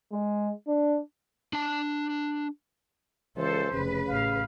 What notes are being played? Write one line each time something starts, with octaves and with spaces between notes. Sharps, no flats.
G#3
D4
D4 A5
C#2 E3 A4 C5
F1 C#3 B4
A1 F5